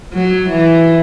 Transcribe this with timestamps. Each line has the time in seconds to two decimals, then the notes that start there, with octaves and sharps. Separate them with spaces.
0.13 F#3
0.49 E3